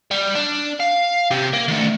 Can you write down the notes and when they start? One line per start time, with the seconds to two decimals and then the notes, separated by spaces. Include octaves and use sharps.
0.11 G3
0.35 D4
0.80 F5
1.31 C3 G4
1.53 A#3
1.68 D#3 A3